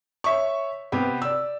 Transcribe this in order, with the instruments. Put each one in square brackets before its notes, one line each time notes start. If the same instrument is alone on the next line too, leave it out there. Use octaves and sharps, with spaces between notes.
[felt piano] C#5 E5 C#6
C3 B3 G4
D5 E6